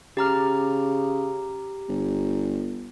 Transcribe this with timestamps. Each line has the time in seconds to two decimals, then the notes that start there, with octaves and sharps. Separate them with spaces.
0.17 C#3 G4 A#5 F6
1.89 G1